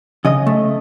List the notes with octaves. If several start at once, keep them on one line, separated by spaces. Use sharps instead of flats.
C#3 D#5
A3